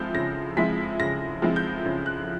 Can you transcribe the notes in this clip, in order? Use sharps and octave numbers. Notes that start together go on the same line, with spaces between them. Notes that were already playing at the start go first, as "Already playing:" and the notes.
Already playing: F3 G#3 C4 E4 G6
C#3 A#6
F3 G#3 C4 E4 B6
C#3 A#6
F3 G#3 C4 E4
G6
C#3
F#6